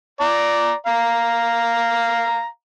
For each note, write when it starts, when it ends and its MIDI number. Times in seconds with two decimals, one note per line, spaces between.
0.21 0.74 74
0.21 0.74 82
0.86 2.46 77
0.86 2.46 82